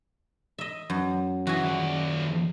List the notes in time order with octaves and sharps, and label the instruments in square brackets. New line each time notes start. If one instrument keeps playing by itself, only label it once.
[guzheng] D#5 E5
F#2
[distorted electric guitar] E3 [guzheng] F#4 G#4
[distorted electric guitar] D#2 D5